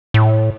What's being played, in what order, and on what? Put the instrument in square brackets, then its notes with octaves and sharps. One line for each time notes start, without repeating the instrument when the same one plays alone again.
[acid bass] A2